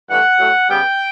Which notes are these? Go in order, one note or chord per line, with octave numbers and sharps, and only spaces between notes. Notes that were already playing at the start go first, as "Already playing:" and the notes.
G2 E3 A3 F#5
A2 F#3 A3
C#3 G3 B3 G5